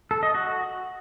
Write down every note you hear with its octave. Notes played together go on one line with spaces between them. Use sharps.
A4
D#5
F#4